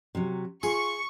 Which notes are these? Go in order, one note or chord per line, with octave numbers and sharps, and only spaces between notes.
C3 F#3
F4 G#4 C#6